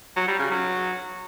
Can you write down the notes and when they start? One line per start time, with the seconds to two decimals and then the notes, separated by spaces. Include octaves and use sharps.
0.16 F#3
0.28 G3
0.39 C#3
0.51 F#3